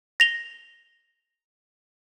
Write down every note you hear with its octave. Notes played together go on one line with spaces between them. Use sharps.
A#6 F7 G7